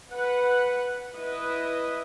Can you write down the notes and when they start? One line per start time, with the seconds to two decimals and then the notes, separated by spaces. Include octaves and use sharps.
0.12 B4 F#5
1.15 E4 B4 D#5